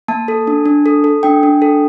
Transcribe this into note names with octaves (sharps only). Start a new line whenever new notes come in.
A#3 A5
A4
D4
D4
A4
A4
D4 G5
D4
A4